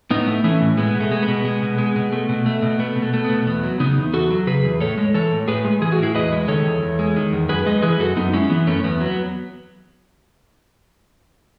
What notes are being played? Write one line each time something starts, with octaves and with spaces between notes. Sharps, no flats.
A2 B3 D#4
A3
E3 A3 C#4
A2
G#3 B3
B2
A3
G#3
B3
B2
G#3
B2
G#3
B2
A3
B2
A3
B2
A3 B3
B2
A3
A3
B3
B2
E2 B3
F#3
C#3 B3 D#4
E2
E2 F#4 A4
F#3
C#3 G#4 B4
E2
A2 A4 C#5
G#3
E3 A4 C#5
A2
A2 G#4 B4
G#3
E3 G#4
F#4
A2 E4 G#4
E2 B4 D#5
G#3
D#3 A4 C#5
E2
E2
G#3
D#3
E2
F#2 G#4 B4
G#3 B4 D#5
E3 G#4 B4
B4
F#2 F#4 A4
F#2 B3 D#4
G#3 C#4 E4
E3 B3
F#2 A3 C#4
E2 B3
F#3 B3